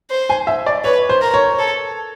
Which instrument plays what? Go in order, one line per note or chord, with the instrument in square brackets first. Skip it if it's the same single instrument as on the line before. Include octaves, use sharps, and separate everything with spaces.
[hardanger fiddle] C5
[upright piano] G#5
E5
D5
[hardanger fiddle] B4 [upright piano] C#5
[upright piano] C5
[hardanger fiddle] A#4
[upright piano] C#5
[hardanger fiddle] A4